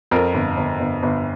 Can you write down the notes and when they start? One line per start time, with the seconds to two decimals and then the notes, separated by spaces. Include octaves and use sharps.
0.11 F2 A#4
0.34 G1
0.57 G1
0.80 G1
1.03 G1